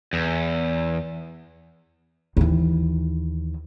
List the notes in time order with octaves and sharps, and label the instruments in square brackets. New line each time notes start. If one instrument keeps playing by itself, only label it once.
[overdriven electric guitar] E2
[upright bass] D#2 E3